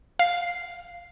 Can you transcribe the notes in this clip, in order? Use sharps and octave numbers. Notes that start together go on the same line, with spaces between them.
F5 C7